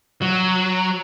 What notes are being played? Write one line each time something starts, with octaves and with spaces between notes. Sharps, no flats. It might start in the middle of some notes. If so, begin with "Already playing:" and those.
F#3